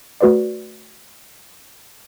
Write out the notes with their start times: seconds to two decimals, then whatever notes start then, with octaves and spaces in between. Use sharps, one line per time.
0.21 A3 F#4 B4 C5 D5